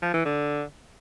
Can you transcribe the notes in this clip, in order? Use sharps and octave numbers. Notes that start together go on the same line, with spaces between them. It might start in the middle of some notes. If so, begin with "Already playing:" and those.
F3
E3
D3